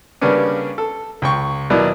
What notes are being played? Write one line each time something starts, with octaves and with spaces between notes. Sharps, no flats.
C#3 G3 A#3 B3 C#4 D4
A4
C#2 G5 C#6
D#2 B2 F#3 A#3 E4 D5